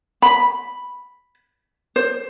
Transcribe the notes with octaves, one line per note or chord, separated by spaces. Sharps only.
B5
C5